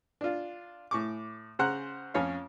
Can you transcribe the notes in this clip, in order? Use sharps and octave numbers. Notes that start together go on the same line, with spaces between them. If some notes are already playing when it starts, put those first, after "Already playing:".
D4 F4
A2 C#6 D6
C#3 C5 F#5 A#5 F#6
F2 C#4 C#5 F5